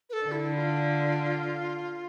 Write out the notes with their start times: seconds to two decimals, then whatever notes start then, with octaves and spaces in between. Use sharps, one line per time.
0.10 B4
0.13 A4
0.25 D3
0.32 E4
0.55 F4